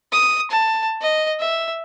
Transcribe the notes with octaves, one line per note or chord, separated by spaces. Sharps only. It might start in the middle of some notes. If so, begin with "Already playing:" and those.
D#6
A5
D#5
E5